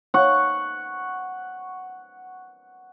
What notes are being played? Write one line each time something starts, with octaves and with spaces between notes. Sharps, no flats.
F#5 C#6